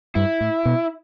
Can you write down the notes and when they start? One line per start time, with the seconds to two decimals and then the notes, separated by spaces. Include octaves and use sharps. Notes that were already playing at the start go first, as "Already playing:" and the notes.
0.15 G2 E4
0.41 A2
0.65 B2